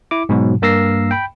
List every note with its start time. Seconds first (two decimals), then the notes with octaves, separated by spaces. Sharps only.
0.11 E4 D6
0.29 G#2 B2 F#3
0.62 G2 A#3 A#4 E6 A#6 C7
1.11 G5 B5